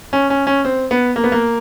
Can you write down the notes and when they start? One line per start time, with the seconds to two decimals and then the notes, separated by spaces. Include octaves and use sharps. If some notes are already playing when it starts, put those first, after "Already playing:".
0.13 C#4
0.30 C#4
0.47 C#4
0.65 C4
0.91 B3
1.16 A#3
1.24 B3
1.32 A#3